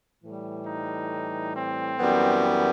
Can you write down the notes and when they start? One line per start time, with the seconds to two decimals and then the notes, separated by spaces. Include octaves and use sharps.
0.23 A2 E3 G3
0.67 D#4
1.55 C4
1.99 F#2 E3 G3 B3